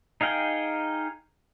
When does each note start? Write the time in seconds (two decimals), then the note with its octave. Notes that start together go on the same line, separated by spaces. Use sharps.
0.21 D#4 G#4 F5 G5